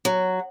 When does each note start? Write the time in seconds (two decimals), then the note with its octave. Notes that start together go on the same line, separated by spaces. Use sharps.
0.05 F#3